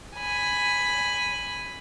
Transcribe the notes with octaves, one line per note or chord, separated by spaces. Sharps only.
G#5 B5